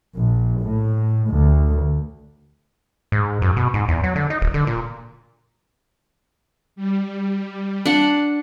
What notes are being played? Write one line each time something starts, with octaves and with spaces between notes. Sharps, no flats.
A#1
A2
D2
G#2
F#2
B2
G#2
E2
F#3
D3
D#4
D#1
D3
A#2
G3
D4 F#5